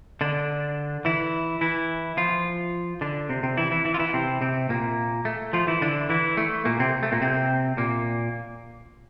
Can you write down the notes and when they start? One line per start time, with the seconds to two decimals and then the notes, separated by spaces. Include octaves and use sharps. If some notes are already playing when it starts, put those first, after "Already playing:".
0.21 D3 D4
1.05 E3 E4
1.61 E3 E4
2.17 F3 F4
3.01 D3 D4
3.29 C3 C4
3.43 C3 C4
3.57 E3 E4
3.71 E3 E4
3.85 E3 E4
3.94 F4
3.99 E3 E4
4.13 C3 C4
4.41 C3 C4
4.69 A#2 A#3
5.25 A3
5.53 F3 F4
5.67 E3 E4
5.81 D3 D4
6.09 E3 E4
6.37 A3
6.65 A#2 A#3
6.79 C3 C4
7.03 A3
7.12 A#2 A#3
7.21 C3 C4
7.77 A#2 A#3